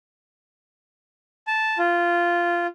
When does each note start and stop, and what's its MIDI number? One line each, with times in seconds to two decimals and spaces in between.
1.47 1.78 81
1.78 2.67 65